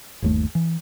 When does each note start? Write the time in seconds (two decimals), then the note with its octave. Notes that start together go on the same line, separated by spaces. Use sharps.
0.22 G1 D#2 A3
0.55 E3